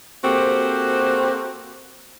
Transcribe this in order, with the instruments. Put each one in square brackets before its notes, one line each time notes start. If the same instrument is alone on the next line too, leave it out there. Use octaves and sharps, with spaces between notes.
[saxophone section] A#3 C4 F#4 G4 A4 C5